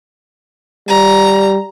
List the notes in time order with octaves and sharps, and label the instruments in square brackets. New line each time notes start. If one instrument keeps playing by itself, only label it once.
[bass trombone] G3 [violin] A#5